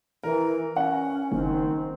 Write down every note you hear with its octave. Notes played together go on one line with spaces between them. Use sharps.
E3 A#4
C#4 F#5
F#1 D#3 C4